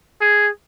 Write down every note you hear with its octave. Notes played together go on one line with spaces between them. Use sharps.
G#4